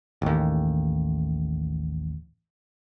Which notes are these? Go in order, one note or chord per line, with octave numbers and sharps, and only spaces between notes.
A1 D#2